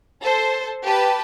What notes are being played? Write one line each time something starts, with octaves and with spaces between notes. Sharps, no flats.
A4 C5
G4 B4 A5